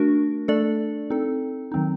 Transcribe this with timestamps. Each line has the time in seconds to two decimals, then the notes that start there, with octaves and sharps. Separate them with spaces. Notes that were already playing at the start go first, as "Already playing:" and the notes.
Already playing: A3 D4 F#4 A#4
0.48 A3 D4 A4 D5
1.10 C4 D#4 A4
1.72 D#3 F#3 C4 D#4